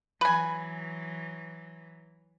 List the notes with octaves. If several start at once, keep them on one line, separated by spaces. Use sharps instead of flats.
E3 F#3 B4 G#5